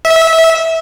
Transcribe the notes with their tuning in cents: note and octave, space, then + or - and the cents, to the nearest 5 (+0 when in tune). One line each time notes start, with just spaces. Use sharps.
E5 -20